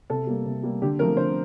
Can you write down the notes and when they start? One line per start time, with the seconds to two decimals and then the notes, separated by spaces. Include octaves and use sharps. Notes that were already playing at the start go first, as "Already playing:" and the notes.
0.10 C3 A4
0.27 G3 A#3
0.45 C3
0.63 G3 A#3
0.82 D3 G4
0.99 F3 A3 C4 A#4
1.17 D3 C5